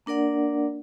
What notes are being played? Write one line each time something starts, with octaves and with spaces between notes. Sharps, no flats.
A#3 D4 A#4 D5 F#5